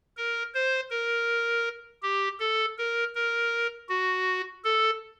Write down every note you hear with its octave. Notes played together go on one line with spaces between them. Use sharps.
A#4
C5
A#4
G4
A4
A#4
A#4
F#4
A4